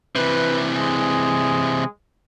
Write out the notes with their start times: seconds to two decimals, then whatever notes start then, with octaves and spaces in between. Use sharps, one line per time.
0.16 C3 E3 B4
0.76 G#3